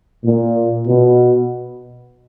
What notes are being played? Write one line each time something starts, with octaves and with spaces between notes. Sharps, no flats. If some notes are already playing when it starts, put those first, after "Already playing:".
A#2
B2